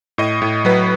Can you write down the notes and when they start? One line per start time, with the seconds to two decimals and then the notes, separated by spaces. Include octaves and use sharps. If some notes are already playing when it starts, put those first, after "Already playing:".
0.18 A2 D#5
0.42 A2
0.65 F#3 B4